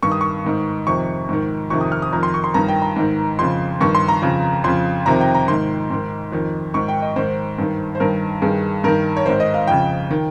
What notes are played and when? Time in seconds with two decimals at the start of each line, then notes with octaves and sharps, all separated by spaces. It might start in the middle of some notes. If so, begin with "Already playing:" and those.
0.03 G2 D#3 C#6
0.12 D#6
0.21 C#6
0.45 G#2 D#3
0.87 F2 C3 D#3 C#6
1.29 G#2 D#3
1.70 F2 C3 D#3 C#6
1.81 D#6
1.92 F6
2.02 D#6
2.13 F2 D#3 A#5
2.23 C6
2.34 C#6
2.44 C6
2.54 G2 D#3 A#5
2.68 G5
2.82 A#5
2.96 G#2 D#3
3.39 F2 C#3 C6
3.81 G2 D#3 C#6
3.95 C6
4.08 A#5
4.22 F2 C#3
4.64 F2 C#3 C6
5.06 F2 C3 D#3 A#5
5.21 G5
5.34 A#5
5.48 G#2 D#3 C6
5.90 G#2 D#3
6.32 F2 D#3
6.74 G#2 D#3 C#6
6.88 G5
7.02 D#5
7.16 G#2 D#3 C5
7.58 G2 D#3
7.95 C5
8.00 G2 D#3 A#4
8.42 G2 D#3 G#4
8.84 G2 D#3 A#4
9.17 C#5
9.26 G#2 D#3 C5
9.40 D#5
9.54 F5
9.67 F2 C#3 G5
10.11 D#3